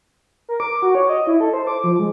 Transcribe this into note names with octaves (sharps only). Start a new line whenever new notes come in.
A#4
D6
F#4
C#5
D#5
E4
A4
C5
D6
F3
G#3